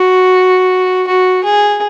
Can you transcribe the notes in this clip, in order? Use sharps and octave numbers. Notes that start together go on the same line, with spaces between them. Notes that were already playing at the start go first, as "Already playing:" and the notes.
Already playing: F#4
F#4
G#4